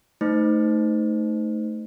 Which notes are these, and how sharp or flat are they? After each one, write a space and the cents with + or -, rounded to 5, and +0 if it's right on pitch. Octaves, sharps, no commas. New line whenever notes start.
A3 +0 D#4 +0 C5 -30